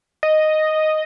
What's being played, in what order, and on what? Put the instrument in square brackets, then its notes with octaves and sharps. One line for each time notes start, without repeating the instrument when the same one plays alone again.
[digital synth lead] D#5